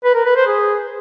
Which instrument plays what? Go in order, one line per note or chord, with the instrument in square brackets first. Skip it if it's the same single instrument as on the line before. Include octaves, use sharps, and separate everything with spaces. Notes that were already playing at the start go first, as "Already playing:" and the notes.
[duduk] B4
A#4
B4
C5
G#4